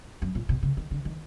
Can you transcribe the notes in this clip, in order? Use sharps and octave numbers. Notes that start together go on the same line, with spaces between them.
F#2
A#2
B2
C#3
D#3
D3
D#3